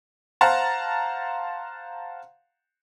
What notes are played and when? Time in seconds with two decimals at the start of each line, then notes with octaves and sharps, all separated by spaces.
0.41 C5 F5 F#5 A5 A#5